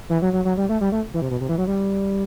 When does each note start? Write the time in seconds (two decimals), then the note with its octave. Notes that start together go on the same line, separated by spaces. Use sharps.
0.10 E3
0.22 F#3
0.33 F#3
0.45 F#3
0.57 G3
0.69 A3
0.81 G3
0.92 A3
1.14 E3
1.22 C3
1.31 B2
1.41 C3
1.49 E3
1.58 F#3
1.67 G3